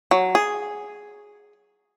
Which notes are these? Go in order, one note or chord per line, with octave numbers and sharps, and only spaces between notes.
F#3
G#4